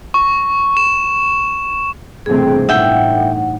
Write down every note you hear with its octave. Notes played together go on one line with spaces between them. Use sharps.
C#6
E7
E1 G2 C3 A3 C4 G#4
A2 D#4 E5 F#5 G5